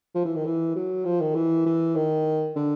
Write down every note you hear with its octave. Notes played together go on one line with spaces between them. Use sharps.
F3
E3
D#3
E3
F#3
F3
D#3
E3
E3
D#3
D3